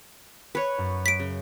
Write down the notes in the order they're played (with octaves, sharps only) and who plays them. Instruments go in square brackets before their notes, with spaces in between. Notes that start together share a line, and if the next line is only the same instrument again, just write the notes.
[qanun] B4 C#5
[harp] F#2
[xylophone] B6 D7
[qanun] C#3